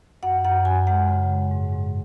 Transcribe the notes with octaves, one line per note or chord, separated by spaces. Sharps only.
F#2 F#5
F#2 F#5
F#2 G#5
G#3 F#5
C#3
G#3
G#2
G#2